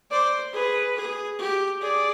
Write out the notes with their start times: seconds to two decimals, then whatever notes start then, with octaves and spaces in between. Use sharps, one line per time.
0.11 C5 D5
0.53 G#4 B4
0.96 G#4
1.39 G4
1.81 G#4 D5